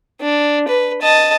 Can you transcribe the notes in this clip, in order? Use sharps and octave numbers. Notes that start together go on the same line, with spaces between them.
D4
B4
D#5 A5